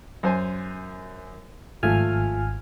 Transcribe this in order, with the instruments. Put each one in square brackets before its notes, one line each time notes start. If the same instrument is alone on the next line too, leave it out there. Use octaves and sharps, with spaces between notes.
[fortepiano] F#2 C5 G#5
[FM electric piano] G#1 G#5 F6 [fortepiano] F3 A3 F4